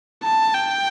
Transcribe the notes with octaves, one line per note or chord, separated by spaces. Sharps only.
A5
G5